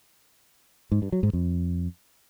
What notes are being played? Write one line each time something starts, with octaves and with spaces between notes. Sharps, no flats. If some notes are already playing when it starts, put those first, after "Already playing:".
G#2
G2
F#3
G#2
F2